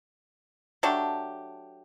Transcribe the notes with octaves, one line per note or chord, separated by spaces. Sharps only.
F#3 A3 D4 G4